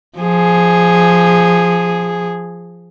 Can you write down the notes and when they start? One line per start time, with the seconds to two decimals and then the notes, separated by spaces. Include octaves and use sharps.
0.18 F3 G#4